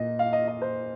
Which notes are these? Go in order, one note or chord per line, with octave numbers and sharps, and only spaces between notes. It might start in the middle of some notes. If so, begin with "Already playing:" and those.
Already playing: A#2 D#5
F5
D#5
D#5
C5